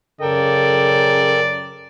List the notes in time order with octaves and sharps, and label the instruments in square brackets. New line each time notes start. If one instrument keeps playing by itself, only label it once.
[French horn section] F#2 C#3 [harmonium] A4 A#4 G5 [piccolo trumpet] D5